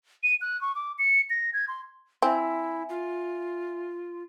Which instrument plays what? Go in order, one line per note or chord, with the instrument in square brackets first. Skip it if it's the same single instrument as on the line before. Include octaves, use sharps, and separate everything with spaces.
[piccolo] D#7
F#6
C#6
D6
C#7
A#6
G#6
C6
[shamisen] C4 [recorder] E4 [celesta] E5 G#5
[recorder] F4